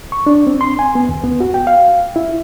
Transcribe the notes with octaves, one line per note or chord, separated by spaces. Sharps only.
C#6
D4
C4
C6
G#5
B3
D#2
B3
F#4
G5
F5
E4